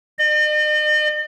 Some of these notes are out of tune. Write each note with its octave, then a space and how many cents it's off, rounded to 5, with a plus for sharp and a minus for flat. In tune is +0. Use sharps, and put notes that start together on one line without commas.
D#5 -45